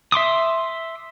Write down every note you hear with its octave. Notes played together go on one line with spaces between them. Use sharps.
E5 C6 D6 D#6